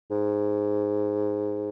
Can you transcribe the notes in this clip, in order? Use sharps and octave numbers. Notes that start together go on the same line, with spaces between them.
G#2